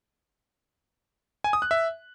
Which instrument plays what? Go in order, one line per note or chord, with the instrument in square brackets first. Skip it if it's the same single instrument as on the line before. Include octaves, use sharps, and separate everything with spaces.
[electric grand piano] G#5
D#6
F#6
E5